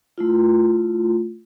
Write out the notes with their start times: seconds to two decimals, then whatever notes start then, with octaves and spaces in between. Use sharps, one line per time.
0.18 A3 E4 F4